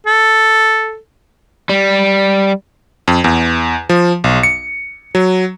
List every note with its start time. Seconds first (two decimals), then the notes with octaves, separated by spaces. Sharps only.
0.06 A4
1.69 G3
3.08 F2
3.24 E2
3.89 F3
4.24 B1
4.43 C#7
5.15 F#3